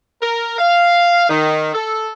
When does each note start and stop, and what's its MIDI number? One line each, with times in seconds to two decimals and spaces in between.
0.21 0.55 70
0.58 1.28 77
1.29 1.72 51
1.74 2.11 69